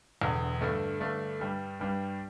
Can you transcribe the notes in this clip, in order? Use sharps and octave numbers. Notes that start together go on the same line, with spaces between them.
E1 E2 D3
G2 D3 A3 D4
G2 D3 A3 D4
G2 G3 D4
G2 G3 D4